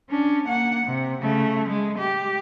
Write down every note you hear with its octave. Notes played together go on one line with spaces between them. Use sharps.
C#4 D4
A#3 F#5
C3
C#3 A3
G#3
G4